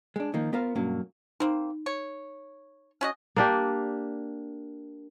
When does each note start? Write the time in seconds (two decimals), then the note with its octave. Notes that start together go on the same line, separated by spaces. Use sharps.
0.16 G#3 D4
0.34 D#3 F3 A#3
0.53 B3 F4 A#4 C5 F5
0.75 B1 G2 F#3 A#3 C#4
1.40 A#3 C4 D#4
1.86 C#5
3.01 C#4 F#4 D#5
3.36 A#3 D4 G4